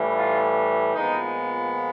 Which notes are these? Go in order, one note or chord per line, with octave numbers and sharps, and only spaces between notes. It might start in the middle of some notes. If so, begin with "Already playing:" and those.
Already playing: A2 E3 G3
F4
A#2 F3 G#3 B3 D#4